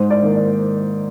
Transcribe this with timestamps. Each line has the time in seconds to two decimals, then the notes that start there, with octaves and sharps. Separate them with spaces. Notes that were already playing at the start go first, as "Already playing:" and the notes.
Already playing: G#2 C5
0.10 D5
0.22 D#3 A#3
0.35 D5